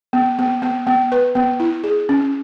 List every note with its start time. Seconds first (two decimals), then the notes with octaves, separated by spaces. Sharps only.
0.13 B3
0.39 B3
0.62 B3
0.87 B3
1.12 B4
1.35 B3
1.60 E4
1.84 G#4
2.09 C#4